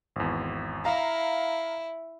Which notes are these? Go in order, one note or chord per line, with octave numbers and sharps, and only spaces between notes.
G#1 E2
E4 F5 A#5